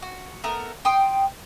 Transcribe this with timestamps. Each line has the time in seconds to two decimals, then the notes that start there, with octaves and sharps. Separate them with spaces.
0.02 F#4
0.44 A3 B3 A#4
0.85 G5 C6 D#6